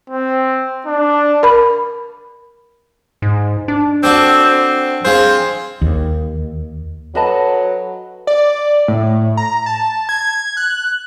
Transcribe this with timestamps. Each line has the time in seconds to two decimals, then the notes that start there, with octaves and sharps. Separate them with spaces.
0.10 C4
0.86 D4
1.43 A#4 B5
3.22 G#2
3.68 D4
4.03 C4 F#4 A4 D5
4.45 C4
5.05 C4 F4 G#4 C5
5.82 D#2
7.15 F#3 F#4 A4 B4 D#5 A5 B5
8.27 D5
8.88 A2
9.37 A#5
9.66 A5
10.09 G#6
10.57 F#6